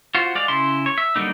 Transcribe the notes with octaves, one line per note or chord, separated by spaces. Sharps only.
F4 F#4 C5
G#3 D5 F5
C#3 E4 C6
C#5
E5
D3 F#3 G3 A#3 D#4